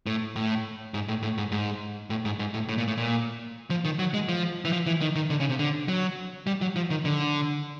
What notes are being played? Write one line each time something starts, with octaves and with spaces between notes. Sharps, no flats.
A2
A2
G#2
A2
A2
G#2
G#2
A2
G#2
G#2
A2
A2
A#2
A2
A#2
F3
D#3
F#3
G#3
F3
E3
F3
E3
D#3
D#3
D3
C#3
C3
D3
F#3
G3
F#3
F3
D#3
D3